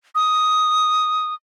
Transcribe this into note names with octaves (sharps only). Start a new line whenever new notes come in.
D#6